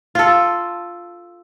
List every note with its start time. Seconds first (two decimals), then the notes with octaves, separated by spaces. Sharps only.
0.15 F4 A4